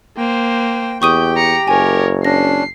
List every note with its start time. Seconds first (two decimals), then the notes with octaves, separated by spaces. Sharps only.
0.17 A#3 C5 G5
1.02 E2 G4 G5 C#6 D#6 G6 D#7
1.36 A#5 C#7
1.68 F#1 A#4 C#5 G#5
2.25 C#4 D4 A#6 C7